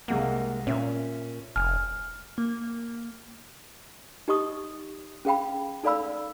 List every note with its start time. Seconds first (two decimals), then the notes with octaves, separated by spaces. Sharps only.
0.08 C2 G#3 A#3 F#5
0.67 A#2 C#4 E5
1.56 F1 G#5 F6
2.38 A#3
4.28 D#4 G4 D#5 C#6 D#6
5.25 C#4 G#4 F5 G5 B5
5.84 D#4 A4 D5 F5 B5 E6